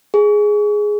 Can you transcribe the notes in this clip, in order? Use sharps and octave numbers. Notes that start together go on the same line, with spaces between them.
G#4